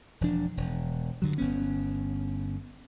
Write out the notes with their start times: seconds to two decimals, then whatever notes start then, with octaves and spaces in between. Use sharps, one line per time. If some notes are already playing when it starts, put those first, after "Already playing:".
0.21 E1 F3 D4
0.57 E1
1.22 G2 D3 F#3
1.38 G1 B3 C#4